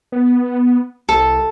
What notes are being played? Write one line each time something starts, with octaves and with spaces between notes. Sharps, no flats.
B3
C2 A4